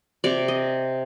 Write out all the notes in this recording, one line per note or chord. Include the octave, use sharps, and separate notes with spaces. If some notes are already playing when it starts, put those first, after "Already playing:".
C3 D5
D#5